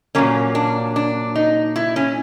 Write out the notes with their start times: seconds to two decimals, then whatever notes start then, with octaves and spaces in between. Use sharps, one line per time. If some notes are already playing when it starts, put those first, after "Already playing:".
0.15 A#2 F#3 A#3 C#4
0.55 D4
0.96 D4
1.35 D#4
1.76 E4
1.96 C#4